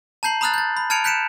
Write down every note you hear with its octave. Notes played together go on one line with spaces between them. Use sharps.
A5 A#5 G6 C7 F#7
A#5 B5 D#6 F6 F#6 A6
G6 A6
B5
A5 F6 G#6 C#7 D7 F7
F#6 G6 B6 C#7 D7 E7